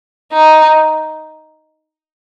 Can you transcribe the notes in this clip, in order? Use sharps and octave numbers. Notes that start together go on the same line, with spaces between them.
D#4